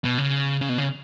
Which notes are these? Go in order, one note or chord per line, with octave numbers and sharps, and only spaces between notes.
B2
C#3
C#3
B2
C#3